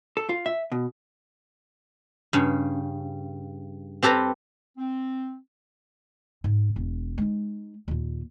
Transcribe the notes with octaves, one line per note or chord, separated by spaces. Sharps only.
A4
F4
E5
B2
G2 C#3
C4 G4 A4 B4 A#5
C4
G#2
E1
G#3 D#4
D#2 A#2